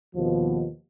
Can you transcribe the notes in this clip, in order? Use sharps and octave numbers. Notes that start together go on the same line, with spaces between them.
D#2 B2 F3